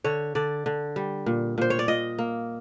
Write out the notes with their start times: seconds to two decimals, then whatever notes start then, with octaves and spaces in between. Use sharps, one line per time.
0.04 D3 C#5
0.35 D3 D5
0.66 D3
0.96 G3
1.26 A#2
1.58 A#2 C5
1.70 C#5
1.79 D5
1.88 A#2 D#5
2.18 A#3